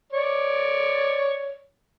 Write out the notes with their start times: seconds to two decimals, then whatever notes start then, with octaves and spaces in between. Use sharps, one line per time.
0.13 C#5 D5